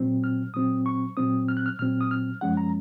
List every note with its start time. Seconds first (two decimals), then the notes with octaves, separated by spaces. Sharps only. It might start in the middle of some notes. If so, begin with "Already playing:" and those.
Already playing: A#2 F#3 C4
0.24 F6
0.54 A#2 F#3 C4 D#6
0.86 C#6
1.17 A#2 F#3 C4 D#6
1.48 F6
1.57 F#6
1.66 F6
1.79 A#2 F#3 C4 F6
2.01 D#6
2.11 F6
2.41 F#2 F3 G#3 C#4 F#5
2.57 A#5